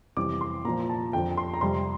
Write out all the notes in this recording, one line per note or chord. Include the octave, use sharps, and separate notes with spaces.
F2 C3 E3 G3 D6
C6
A#2 F3 A#5
A5
F2 D3 F3 G5
C6
A#5
F2 C3 G3 C6